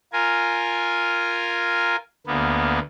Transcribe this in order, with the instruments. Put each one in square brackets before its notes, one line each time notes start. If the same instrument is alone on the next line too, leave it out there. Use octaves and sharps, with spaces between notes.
[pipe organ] F4 A#4 G#5
D2 A#3 B3